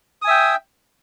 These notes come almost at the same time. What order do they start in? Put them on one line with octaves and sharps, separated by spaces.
D#6 G#5 E5 G5